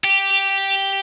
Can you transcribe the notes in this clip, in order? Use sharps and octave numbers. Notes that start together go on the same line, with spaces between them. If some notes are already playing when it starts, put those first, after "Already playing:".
G4